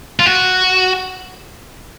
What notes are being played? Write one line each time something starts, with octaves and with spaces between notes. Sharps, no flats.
F4
F#4